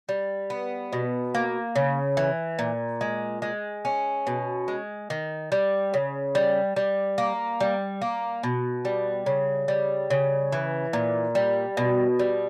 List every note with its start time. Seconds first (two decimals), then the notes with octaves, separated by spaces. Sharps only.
0.09 G3
0.50 B3
0.93 B2
1.35 A#3
1.76 C#3
2.17 E3
2.59 A#2
3.01 G#3
3.42 G#3
3.85 C#4
4.27 B2
4.68 G#3
5.10 D#3
5.52 G3
5.94 C#3
6.35 G3
6.76 G3
7.18 A#3
7.60 G3
8.02 A#3
8.43 B2
8.85 G3
9.26 C#3
9.68 G3
10.10 C#3
10.52 E3
10.93 A#2
11.35 G3
11.77 B2
12.19 G3